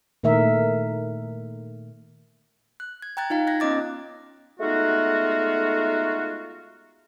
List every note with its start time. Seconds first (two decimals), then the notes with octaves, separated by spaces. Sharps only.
0.23 A#2 D#3 A3 A#4 E5
2.80 F#6
3.02 G#6
3.17 G5 A#5 F#6 G#6 A6
3.30 D#4 F4 F5 A#5
3.47 F#6 G#6 A#6
3.60 B3 C#4 D#5 D6 A6
4.60 G#3 A3 B3 D#4 F4 F#4